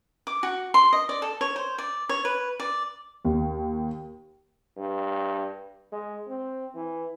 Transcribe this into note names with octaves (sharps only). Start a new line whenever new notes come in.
D6
F#4
C6
D#5
D5
A4
C#5
C5
D5
C#5
B4
D5
D#2
G2
G#3
C4
E3